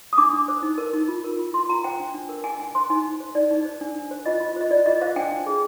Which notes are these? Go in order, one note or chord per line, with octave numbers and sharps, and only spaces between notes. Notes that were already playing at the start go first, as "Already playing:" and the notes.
D#6
D4 D6
D4
C5
D#4
A#4
D#4
F4
A#4
F4
F4 C6
F4 A#5
C5 G5
D4
D4
A#4
D4 G#5
D4 G#5
C5 C6
D#4 G#5
D#4
C5
D#4 D5
D#4
C5
D4
D4
C5
F4 D#5
F4
C5 D#5
F4 D5
F4 D#5
C5 F5
D4 G5
D4
G#4